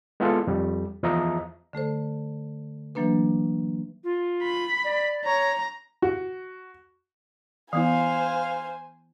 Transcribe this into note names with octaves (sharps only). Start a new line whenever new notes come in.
G#3 B3 E4 F4 A4
F2 G3
E2 F3 D#5 E5 A#5
D3 A3 A4 C5
E3 F#3 A#3 D4 B4
F4
B5
D5
C#5 A#5
F#4
E3 B3 E4 C5 F5 G#5